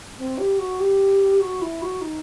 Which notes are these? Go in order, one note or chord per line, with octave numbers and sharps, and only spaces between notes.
C4
G4
F#4
G4
F#4
E4
F#4
D#4